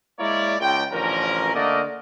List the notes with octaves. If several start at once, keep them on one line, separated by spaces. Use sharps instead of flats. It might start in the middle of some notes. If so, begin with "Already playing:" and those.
G#3 A#3 E4 A#4 C#5 D5
C#2 G5
A1 D3 F3 C#4 A#4
D3 A3 A#3 A#4 D5 D#5